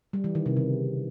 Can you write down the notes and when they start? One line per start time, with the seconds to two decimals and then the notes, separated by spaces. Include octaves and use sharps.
0.13 G3
0.24 E3
0.35 D#3
0.46 C3
0.57 C#3